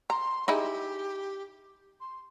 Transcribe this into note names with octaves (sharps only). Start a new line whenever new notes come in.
A#5 C6
D#4 E4 G4 G#4
C6